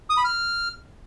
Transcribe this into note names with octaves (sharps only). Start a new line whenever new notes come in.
D#6
B5
F6